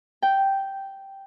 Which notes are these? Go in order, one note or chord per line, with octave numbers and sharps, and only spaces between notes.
G5